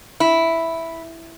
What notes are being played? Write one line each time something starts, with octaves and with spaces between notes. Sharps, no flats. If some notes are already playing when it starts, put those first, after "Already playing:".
E4